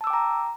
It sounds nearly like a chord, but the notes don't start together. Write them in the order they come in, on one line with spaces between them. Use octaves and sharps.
A5 E6 D6 G5 A#5